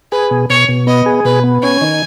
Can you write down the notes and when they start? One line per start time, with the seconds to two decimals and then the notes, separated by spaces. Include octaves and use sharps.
0.12 G#4 B4
0.31 B2
0.50 B2 C#5
0.69 B2
0.87 B3 D#5
1.06 G#4
1.25 B2 B4
1.44 B3
1.63 C#4 G#5
1.81 D#3